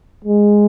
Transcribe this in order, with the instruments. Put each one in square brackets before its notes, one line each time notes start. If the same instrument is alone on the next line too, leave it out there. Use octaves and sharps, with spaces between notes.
[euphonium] G#3